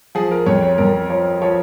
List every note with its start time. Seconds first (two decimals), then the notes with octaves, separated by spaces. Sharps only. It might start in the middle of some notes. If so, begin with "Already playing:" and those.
0.15 F3 G#4
0.31 A#4
0.46 F2 C#5
0.63 C#5
0.78 F2 A#4
1.09 F3 C#5
1.42 F3 C#5